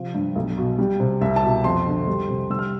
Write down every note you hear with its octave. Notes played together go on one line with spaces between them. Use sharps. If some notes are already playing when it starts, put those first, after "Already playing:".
Already playing: C3 F3
G2
B1
B2
G3
C3
C2 E5
A5
B2
F2 C6
D3
G3
C3
G3 E6
F6